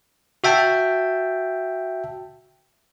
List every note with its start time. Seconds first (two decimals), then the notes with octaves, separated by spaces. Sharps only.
0.44 F#4 E5 G5 A5